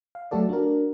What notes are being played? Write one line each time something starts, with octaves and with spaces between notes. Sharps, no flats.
F5
F#3 A3 F#4 A4 D5
D4 F#4 A#4